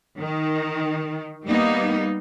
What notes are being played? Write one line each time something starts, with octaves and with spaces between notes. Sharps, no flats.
D#3
G3 A#3 B3 D#4